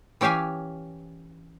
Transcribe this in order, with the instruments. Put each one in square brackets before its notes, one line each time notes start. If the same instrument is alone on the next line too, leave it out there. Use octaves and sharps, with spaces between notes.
[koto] E3 C#4 G4 E5 F5 G#5